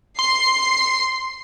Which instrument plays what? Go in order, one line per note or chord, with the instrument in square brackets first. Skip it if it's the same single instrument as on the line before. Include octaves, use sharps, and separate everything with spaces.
[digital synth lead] C6 [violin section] C7